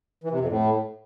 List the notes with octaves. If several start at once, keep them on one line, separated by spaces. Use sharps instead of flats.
E3
C3
F2
A2